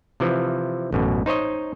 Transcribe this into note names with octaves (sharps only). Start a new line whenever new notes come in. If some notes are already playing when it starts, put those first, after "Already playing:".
C3 E3 F3
A1 F#2 B2
D#4 C5 C#5 D#5